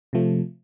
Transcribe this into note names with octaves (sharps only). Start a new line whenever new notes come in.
C3 F3 A3